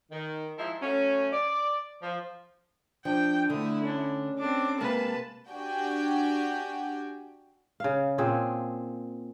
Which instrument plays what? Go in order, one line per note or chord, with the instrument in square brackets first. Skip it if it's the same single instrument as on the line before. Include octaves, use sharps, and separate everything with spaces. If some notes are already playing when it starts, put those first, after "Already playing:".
[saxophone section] D#3
F3 G#3 D#4 E4
F#3 A3 C#4
D5
F3
[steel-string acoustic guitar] F3 [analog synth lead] D4 [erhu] G5
[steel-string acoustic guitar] D3 [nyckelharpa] A3 D#6 [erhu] E4
[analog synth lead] C#4 [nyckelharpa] D4
[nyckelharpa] C4 D4 [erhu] D6
[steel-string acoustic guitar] C3 G#3 A#3 [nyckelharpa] B4 [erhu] A5
[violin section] D4 F#4 G4 G5 G#5
[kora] C#3 F5
A#2 C4 G#4